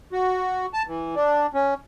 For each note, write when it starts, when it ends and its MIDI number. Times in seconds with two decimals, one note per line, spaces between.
0.12 0.66 66
0.74 0.83 81
0.88 1.15 52
1.15 1.47 62
1.54 1.74 61